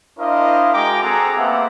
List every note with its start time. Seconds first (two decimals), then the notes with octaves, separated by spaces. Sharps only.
0.20 D4 E4 A#4 C5 D#5 F5
0.73 G#3 F#4 G5 A#5 D6
1.03 C4 G#4 A4 F#5 A#5
1.37 A#3 B3 G4 C5 E5 F#5